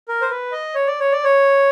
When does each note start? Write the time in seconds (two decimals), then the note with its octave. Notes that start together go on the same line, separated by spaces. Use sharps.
0.08 A#4
0.22 C5
0.30 B4
0.52 D#5
0.75 C#5
0.87 D5
1.00 C#5
1.12 D5
1.24 C#5